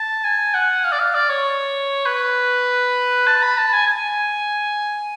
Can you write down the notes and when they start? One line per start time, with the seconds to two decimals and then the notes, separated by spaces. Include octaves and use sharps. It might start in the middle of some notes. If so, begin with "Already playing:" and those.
Already playing: A5
0.24 G#5
0.54 F#5
0.84 F5
0.92 D5
1.00 F5
1.15 D5
1.30 C#5
2.06 B4
3.27 A5
3.43 B5
3.58 A5
3.73 G#5
3.88 G#5